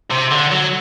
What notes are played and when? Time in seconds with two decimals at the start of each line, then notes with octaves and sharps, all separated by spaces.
0.11 C3
0.31 D3
0.51 F#3